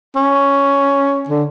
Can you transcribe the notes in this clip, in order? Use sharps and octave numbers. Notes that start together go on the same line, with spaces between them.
C#4
D3